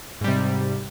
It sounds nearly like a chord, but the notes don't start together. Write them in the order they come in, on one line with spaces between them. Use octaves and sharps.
G#2 G3 C3